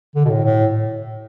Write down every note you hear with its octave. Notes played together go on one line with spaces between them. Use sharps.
D3
B2
A2
A2